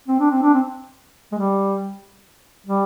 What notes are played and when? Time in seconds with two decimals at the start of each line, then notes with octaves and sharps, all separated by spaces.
0.08 C4
0.20 D4
0.31 C4
0.43 D4
0.54 C4
1.32 G#3
1.38 G3
2.67 G3